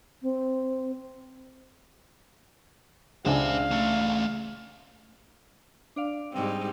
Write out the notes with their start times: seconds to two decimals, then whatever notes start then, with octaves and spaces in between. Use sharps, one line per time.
0.22 C4
3.26 C#2 D4 C5 E5 F5 G#5
3.71 A3 C#4
5.96 D4 D5 F5
6.32 G#2 G3 C4